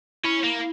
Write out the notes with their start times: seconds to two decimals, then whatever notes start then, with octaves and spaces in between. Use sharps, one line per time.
0.24 C#4 E4
0.43 A#3